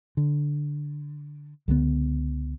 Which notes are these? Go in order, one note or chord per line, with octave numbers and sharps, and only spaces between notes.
D3
C#2 D3 F#3 B3